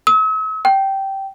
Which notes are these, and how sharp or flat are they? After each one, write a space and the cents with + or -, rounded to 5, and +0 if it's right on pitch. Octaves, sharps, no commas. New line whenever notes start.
E6 -45
G5 -15